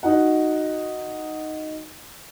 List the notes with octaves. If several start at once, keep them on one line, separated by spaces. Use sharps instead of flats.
D#4 F#4 F#5